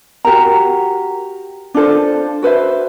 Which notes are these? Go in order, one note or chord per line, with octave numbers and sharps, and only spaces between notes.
F#4 G4 A#4 A#5
D4 F4 A4 C5
F#4 B4 C5 E5